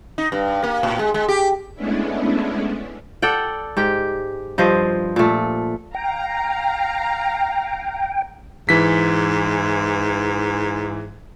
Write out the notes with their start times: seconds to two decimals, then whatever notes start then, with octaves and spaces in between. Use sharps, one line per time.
0.18 D#4
0.32 G2
0.63 A#3
0.83 A2
0.99 G#3
1.14 G#3
1.29 G4
1.75 G#3 A3 B3 C#4 D4 E4
3.22 A4 D5 F#5 G5
3.77 G#2 G4 G5
4.58 G2 F3 C5 D#5
5.16 A#2 A3
5.95 F5 G5 A#5
8.69 G#2 E3 B6